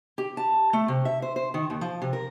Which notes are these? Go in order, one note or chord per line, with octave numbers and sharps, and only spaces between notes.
G4
A5
A3
C3
E5
C5
C5
D#3
D#2
F3
C3
A#4